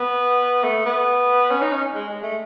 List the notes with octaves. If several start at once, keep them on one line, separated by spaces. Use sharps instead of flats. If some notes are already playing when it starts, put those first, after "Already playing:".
Already playing: B3
A3
B3
C#4
D#4
C#4
G#3
G#3
A3